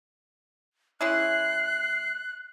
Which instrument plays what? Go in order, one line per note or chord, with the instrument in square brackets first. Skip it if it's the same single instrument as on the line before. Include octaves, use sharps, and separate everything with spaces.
[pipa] G#3 C#4 E4 [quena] F#6 [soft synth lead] C7